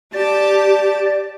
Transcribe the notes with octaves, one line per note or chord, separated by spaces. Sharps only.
G4 D5 A5 D6